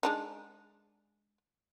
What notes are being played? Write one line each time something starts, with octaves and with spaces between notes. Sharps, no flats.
G#3 D4 D#4